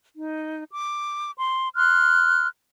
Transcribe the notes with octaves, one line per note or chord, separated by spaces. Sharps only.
D#4
D6
C6
C6 F6 F#6